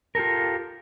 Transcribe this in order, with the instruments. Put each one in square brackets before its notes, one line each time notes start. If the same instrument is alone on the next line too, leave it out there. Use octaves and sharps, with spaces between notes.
[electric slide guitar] F4 G4 A4 A#4